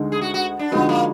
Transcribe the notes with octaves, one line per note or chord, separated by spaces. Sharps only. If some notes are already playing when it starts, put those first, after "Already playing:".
Already playing: D2 D3 G#3 D#4
G#4
F#4
F#4
D4
D3 F3 G#3 B3 D#4 F#4
A#3